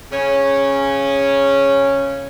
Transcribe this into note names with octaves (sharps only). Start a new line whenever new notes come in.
C#3 C#4